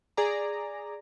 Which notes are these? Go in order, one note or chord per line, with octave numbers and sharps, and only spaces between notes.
G#4 D5 A#5